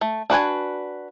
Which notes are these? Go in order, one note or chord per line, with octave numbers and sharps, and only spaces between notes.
A3
D4 F#4 B4 G#5